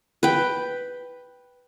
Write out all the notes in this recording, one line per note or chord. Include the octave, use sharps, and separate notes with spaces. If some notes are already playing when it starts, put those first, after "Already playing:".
B4 G5